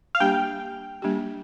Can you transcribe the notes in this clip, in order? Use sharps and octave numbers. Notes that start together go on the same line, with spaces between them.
F5
G3 A#3 D4 G4 G5
G3 A#3 D4 G4